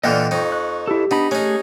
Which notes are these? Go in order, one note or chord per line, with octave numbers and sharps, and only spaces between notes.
A#2 D3 E3 D#5 G5 F6
F2 D#4 C#6
F#6
E4 G4 A4
B3 D4 D#4 B5
A3 C#4 D#4 G#4 F#6